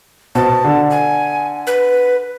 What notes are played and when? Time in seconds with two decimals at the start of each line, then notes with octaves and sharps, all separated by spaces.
0.35 B2 C5 A5
0.64 D3
0.90 G#5
1.67 B4